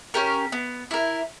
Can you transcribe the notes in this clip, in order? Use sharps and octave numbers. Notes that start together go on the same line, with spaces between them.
C#4 G4 A#4
B3
E4 A#4